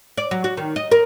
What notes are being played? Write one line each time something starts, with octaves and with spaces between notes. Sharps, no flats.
D5
F#3
F#4
D#3
D#5
A#4